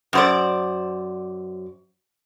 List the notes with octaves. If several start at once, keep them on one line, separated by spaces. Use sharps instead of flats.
F#2 C5 D5